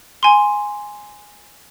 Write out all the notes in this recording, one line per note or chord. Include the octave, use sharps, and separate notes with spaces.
G#5 C6